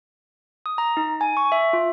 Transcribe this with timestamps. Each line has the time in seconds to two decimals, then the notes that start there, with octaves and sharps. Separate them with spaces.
0.66 D#6
0.78 A#5
0.97 D#4
1.21 G#5
1.37 C#6
1.52 E5
1.73 F4